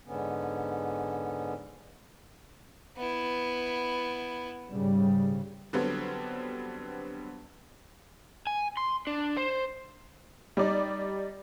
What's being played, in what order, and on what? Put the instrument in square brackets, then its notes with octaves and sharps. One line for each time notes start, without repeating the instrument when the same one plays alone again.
[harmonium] G#2 D3 B3 C#4
[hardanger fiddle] B3 E4
[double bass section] G#2 C#3 G3
[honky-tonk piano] D3 F#3 G3 B3 C4
[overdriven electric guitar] G#5
C6
D4
C5
[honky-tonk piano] G3 D#4 D5